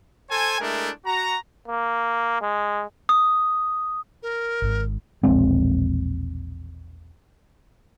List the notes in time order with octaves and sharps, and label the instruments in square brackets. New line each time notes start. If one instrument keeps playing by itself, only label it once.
[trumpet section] A4 C5 G#5
G#3 A3 D4 E4 A#4
F#4 A#5
[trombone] A#3
G#3
[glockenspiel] D#6
[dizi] A#4
[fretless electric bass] G#1 G#2
[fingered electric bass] E1 A#1 G#3 C4